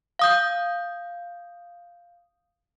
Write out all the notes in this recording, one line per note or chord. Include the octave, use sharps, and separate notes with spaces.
F5 D#6 G6